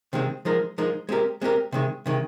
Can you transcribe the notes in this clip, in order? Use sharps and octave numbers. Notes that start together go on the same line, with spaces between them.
C3 D#3 G#3 C4
F3 G#3 D#4 A#4
F3 G#3 D#4 A#4
G#3 C4 G4 A#4
G#3 C4 G4 A#4
C3 D#3 G#3
C3 D#3 G#3